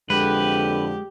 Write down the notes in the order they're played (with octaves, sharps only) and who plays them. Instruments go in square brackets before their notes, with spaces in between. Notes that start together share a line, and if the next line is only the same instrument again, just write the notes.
[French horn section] F2 D3 [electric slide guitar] G#3 [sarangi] G4 [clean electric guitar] B4